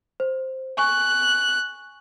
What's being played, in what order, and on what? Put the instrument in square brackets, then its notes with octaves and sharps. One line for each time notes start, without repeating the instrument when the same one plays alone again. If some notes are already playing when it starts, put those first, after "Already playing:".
[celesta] C5
[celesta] G#5 C#6 [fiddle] F#6